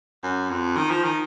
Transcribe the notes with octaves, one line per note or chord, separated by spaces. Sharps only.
F#2
F2
D#3
F3
D#3